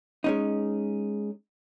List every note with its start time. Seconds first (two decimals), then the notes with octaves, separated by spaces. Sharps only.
0.24 G#3 C#4 D#4